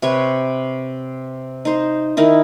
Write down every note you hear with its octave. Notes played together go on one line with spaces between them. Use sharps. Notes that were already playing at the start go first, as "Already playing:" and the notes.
C3 B4 C#5 C#6
D#4 C5
D#3 D#4 E4